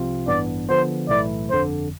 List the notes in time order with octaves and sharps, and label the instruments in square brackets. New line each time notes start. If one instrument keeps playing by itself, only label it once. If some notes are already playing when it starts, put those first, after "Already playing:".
Already playing: [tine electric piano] C2 C3 F3 C4 F4
[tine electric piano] A1 G2 E3 B3 D4 [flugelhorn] D5
[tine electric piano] D3 F3 B3 [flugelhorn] C5
[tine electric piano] B1 A2 E3 A3 E4 [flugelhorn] D5
[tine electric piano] G1 F2 D3 [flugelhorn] C5